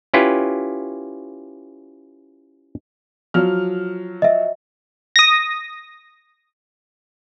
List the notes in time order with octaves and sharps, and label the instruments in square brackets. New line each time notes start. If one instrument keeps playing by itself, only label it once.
[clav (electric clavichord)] C#4 E4 F4 G4 B4
[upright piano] F3 F#3 F6
[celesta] D#5 E5
[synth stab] D#6 A#6